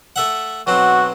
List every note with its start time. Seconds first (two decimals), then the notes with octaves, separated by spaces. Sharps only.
0.16 A3 E5 F#5
0.67 B1 F#3 C4 F#4